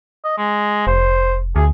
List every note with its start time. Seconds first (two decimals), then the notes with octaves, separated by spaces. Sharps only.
0.24 D#5
0.38 G#3
0.87 F1 C5
1.56 D2 G#4